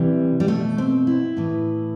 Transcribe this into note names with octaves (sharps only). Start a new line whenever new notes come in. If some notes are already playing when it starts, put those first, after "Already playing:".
Already playing: C3 E3 G3
G3
B2 A3
C4
E4
A2 E3